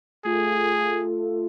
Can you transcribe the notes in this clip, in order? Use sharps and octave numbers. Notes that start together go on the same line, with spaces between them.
A3 F4 G#4 A4